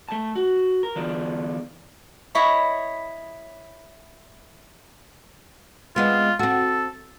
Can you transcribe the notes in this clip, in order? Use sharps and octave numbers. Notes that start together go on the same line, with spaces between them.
A3 A5
F#4
A#4
E2 D3 E3 D4 F4
E4 C#5 D#5 B5
G#3 B3 C4 F4
C4 F#4 A4